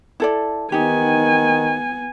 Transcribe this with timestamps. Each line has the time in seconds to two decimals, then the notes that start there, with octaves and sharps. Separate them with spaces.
0.20 E4 A4 D5
0.72 D#3 B3 D#4 G4 G#5